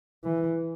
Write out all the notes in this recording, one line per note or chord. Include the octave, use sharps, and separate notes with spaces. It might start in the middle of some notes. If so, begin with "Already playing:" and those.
E3